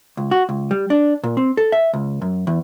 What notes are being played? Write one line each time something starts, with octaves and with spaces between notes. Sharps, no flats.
C#2
F#4
C#2
G3
D4
A#2
C4
A4
E5
C#2
F#2
E2